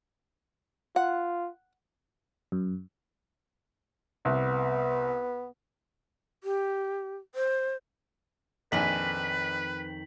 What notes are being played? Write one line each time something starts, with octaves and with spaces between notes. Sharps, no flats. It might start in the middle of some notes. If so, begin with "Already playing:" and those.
F4 F#5
F#2
C2 B3
G4
C5
A#1 F2 D#3 B4 G#5 B6 F#7